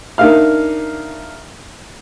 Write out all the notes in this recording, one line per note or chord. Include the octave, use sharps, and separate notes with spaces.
D4 D#4 A#4 E5 F5 F6